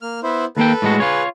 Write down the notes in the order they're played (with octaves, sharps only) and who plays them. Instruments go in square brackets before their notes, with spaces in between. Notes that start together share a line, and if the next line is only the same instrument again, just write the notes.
[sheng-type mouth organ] A#3 F6
B3 E4 C5
[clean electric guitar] D#2 A#3 G5 [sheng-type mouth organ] A4 B4
[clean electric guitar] A2 G#3 F#4
[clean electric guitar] F4 C#5 [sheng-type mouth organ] G#4 B4